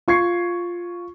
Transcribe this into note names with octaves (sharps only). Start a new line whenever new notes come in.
F4 C#6 G#6 C7